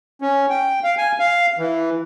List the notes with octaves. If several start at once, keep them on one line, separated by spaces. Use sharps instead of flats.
C#4
G5
F5
G#5
F5
E3